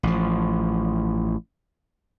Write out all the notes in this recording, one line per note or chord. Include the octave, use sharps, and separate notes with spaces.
A1 F3